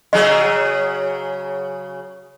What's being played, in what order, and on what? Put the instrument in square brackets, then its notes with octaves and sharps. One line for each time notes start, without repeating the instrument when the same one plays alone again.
[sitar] C#3 F#3 G#4 [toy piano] D#5